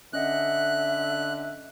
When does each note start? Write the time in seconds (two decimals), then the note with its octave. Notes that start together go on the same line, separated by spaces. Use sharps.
0.13 D3 C#4 D#5 E5 F#5 F#6